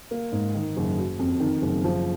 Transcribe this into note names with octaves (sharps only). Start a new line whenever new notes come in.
A#3
G#2
D#3
F#1
F#3
F2
D#3
F#1
F3